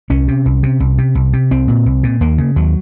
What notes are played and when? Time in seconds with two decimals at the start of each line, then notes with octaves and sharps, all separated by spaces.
0.10 C2 C#4
0.28 C3
0.46 C2
0.63 C3
0.80 C2
0.98 C3
1.15 C2
1.33 C3
1.51 C2 C4
1.68 A#2
1.86 C2
2.03 A#2
2.21 D#2 A#3
2.38 C#3
2.56 D#2 F#3